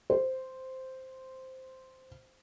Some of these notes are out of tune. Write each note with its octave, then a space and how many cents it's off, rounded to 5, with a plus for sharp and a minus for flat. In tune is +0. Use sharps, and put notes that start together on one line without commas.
C5 -5